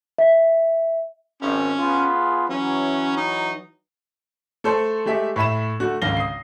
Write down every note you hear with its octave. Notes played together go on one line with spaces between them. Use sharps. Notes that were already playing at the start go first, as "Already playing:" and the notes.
E5
G#1 C#4
B3 F4 G#4
E3 F#3 C#4
D#4
A3 A4 C5
G#3 A3 G4 E5
A2 E5 B5 E7
D3 A3 F#4
G#1 C#2 D3 F5 A#6 G7
D#6 C7